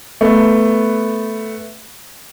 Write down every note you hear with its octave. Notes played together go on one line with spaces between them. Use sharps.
A3 B3